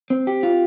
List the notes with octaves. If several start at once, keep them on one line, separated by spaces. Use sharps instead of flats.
C4
G4
F4